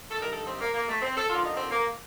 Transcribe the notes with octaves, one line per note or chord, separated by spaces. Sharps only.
A4
G2 D#3 G3 A#4
A4
C4
A#3
A#3
A3
C4
A4
D#2 D3 F3 F4
D#4
C4
A#3